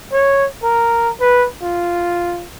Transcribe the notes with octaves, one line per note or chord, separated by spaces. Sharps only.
C#5
A#4
B4
F4